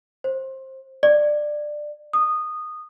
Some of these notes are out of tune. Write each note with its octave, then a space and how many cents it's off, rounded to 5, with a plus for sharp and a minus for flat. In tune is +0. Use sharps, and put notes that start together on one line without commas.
C5 +20
D5 +15
D#6 -15